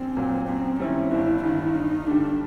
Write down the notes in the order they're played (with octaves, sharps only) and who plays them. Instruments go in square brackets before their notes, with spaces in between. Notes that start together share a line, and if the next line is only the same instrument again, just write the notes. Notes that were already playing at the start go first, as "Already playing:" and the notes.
Already playing: [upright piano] A#1 [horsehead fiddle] C4
[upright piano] A#2 F#3
[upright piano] F#2 [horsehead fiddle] C4
[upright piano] D#3 G3 C4 E4 [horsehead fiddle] C#4
[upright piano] G1 [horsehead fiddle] E4
[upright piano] G2 D#3 [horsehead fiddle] E4
[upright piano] G2 [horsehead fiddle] D#4
[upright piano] D3 G3 [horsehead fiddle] D4